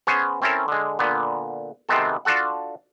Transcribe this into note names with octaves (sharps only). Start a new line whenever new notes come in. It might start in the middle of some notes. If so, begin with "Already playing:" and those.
B3 C#4 G#4 C5 C#5
C4 C#4 E4 A4 A#4 C#5
D3 G#3
A#2 D3 B3
C3 D#3 G#3 B3 C4 A4
D4 F4 F#4 A4 F#5